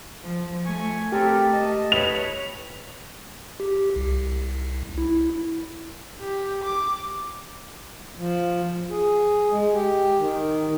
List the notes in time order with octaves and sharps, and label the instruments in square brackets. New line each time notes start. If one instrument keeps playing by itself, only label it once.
[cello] F3
[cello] A3 [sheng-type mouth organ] G#5 C#6
[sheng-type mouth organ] C4 A4 A#4 [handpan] G4
[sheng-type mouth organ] D#5 A5
[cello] B4 C#5 [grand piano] F7
[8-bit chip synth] G4
C2
E4
[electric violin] G4
D6
[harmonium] F3
G#4
G#3
G4
D#3